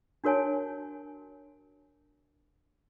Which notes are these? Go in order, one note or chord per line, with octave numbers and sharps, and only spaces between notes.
D4 F#4 A#4 C#5 G#5 A5